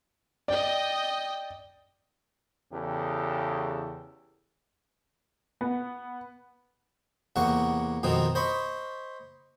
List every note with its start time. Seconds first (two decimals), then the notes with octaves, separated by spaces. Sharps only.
0.48 D5 D#5 G5
2.72 E2 C#3 G4 A4
5.61 B3
7.36 E2 C3 A#3 F#5 C#6
8.03 F2 B2 D#3 C4 D#4
8.35 C5 D#5 B5 C#6